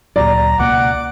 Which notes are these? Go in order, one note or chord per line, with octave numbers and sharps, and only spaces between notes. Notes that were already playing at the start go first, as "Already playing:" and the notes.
D2 A#2 F#3 D5 A#5
C#2 B2 A#3 F#5 D6